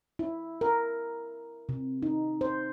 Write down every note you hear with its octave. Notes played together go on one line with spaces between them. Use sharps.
E4
A#4
C3
D#4
C5